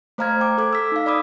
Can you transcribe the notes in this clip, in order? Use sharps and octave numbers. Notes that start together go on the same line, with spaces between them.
A3 C5 F5 A#5 F6 G#6
G5 D6
A4 D6 G#6
E6 B6
D#4 F5
D5 B5 D6 D#6